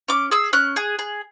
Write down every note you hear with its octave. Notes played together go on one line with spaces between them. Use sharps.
C#4 D6
G#4 E6
C#4 F#6
G#4
G#4